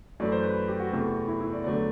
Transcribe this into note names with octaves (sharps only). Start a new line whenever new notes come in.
F#2 E3 A3 D5
C5
B4
G4
F#4
E2 C3 E3 A3
E4
E4
D5
E2 D3 F#3 A3 D5